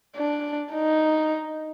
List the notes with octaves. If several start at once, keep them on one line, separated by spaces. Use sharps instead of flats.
D4
D#4